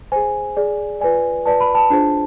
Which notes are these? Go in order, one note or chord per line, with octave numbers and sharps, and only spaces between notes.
G#4 C5 G#5
G#4 D5
F4 B4 D5 G#5
F4 B4 D5 A5
B5
A5
D4 F4 G#4 C5 A5